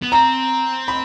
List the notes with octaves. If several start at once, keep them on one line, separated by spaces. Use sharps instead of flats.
B3
C4 A#5
B5